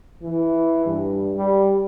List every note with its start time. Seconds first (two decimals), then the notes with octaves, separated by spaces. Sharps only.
0.23 E3
0.86 G2
1.36 G3